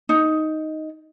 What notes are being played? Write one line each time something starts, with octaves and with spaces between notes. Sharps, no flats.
D#4